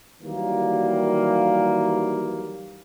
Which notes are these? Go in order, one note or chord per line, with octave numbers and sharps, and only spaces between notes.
D#3 E3 F#3 G3 A#3